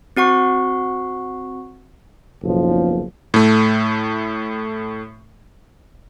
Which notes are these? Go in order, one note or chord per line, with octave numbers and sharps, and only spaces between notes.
C4 F#4 F#5 C#6
F#1 B1 F3
A2 A3